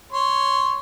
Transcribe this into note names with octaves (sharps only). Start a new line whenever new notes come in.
C#5 C6